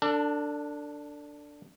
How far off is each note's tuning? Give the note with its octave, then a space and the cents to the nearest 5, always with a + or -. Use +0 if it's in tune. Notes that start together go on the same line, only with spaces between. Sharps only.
D4 +0 A4 +35